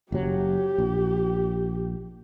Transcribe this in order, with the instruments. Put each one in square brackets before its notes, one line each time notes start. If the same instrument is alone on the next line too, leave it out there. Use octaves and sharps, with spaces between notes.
[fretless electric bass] F#1 F#3 [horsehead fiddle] G4
[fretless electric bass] A#1